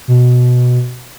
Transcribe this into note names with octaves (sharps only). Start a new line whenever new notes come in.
B2